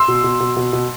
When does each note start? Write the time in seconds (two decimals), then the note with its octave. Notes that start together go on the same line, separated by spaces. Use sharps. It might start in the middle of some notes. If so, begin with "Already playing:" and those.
Already playing: C6 E6
0.08 B2
0.24 B2
0.40 B2
0.57 B2
0.73 B2